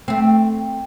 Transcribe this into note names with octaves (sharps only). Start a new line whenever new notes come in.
A3 C4